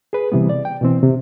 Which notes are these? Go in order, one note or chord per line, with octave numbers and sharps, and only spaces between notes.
G#4 B4
C3 E3 G3 B3
D5
G5
B2 E3 C4
C3